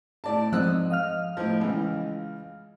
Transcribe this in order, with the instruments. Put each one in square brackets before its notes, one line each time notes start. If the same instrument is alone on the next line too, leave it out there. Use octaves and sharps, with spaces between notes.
[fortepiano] A2 D5 A5
[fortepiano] G#2 E6 F#6 [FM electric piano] F3 C4 D#5
[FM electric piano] D#5 F5 F6
[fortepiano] A2 F3
C#2 E3